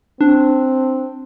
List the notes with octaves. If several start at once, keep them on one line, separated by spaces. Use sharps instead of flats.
C4 D4